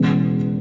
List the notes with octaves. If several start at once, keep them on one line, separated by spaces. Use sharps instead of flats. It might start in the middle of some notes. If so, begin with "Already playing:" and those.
Already playing: E1 E2 C#3